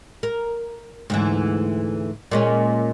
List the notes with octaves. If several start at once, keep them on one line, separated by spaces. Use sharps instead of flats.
A#4
D2 G#2 E3
A#2 G#3 C#4